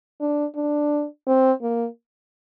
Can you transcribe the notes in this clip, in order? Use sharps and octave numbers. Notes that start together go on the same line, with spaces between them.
D4
D4
C4
A#3